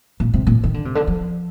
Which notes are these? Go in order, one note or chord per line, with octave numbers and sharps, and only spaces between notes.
A#2
C3
A#2
D#3
D3
C3
D3
F3